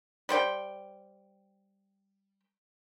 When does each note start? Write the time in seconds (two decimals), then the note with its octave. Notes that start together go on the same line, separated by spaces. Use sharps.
0.29 G3 C5 G5